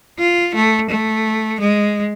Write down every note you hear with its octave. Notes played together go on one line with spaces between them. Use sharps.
F4
A3
A3
G#3